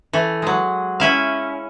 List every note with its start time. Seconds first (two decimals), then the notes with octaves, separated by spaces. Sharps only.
0.13 E3 A3
0.42 F#3 G#3
1.00 C#4 E4 F5